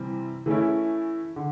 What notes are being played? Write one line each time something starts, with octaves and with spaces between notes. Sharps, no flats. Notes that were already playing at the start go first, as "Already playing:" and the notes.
Already playing: C3 E3 G3 C4
E3 A3 C#4 E4
D3